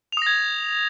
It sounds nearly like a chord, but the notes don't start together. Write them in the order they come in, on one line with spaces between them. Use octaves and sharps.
F7 D#6 A#6 G#6